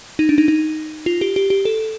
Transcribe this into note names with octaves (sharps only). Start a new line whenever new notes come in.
D#4
D4
D#4
D#4
F4
G4
G4
G4
A4